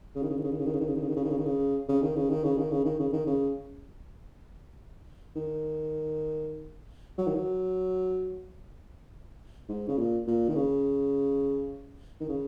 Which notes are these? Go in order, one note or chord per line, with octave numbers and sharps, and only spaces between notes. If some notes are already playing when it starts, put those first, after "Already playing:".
C#3
D#3
C#3
D#3
C#3
D#3
C#3
D#3
C#3
D#3
C#3
D#3
C#3
D#3
C#3
D#3
C#3
D#3
C#3
C#3
D#3
C#3
D#3
C#3
D#3
C#3
D#3
C#3
D#3
C#3
D#3
F#3
D#3
F#3
G#2
C#3
A#2
A#2
D#3
C#3
D#3
C#3